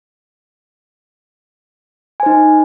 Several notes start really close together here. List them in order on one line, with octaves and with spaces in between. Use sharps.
G#5 C5 D#4